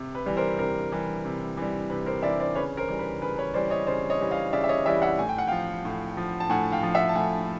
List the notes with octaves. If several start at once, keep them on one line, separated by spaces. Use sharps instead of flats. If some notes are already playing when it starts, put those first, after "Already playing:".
Already playing: C3
B4
E3 G3
A#4 C5
C3 A#4 C5
E3 G3
C3
E3 G3
C3 B4
A#4 C5
E3 G3 D5 E5
C5 D5
C#3 B4 C#5
A#4 C5
E3 G3
B4
C#3 B4
B4 C#5
E3 G3 C5 D5
C#5 D#5
C#3 C5 D5
C#5 D#5
E3 G3
D#5 F5
C#3 D5 E5
E5
C#5 D#5
E3 G3 D5 E5
E5 F#5
A2 G#5
G5
F#5
F3 F5 G5
A2
F3
A5
A2 F#5 G#5
F5 G5
F3
E5 F#5
A5
A2 F#5 G#5